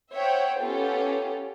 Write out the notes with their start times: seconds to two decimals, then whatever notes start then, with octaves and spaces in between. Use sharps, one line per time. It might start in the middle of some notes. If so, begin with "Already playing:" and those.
0.12 C5 C#5 E5 F#5 G5
0.60 B3 C#4 F4 G4 A4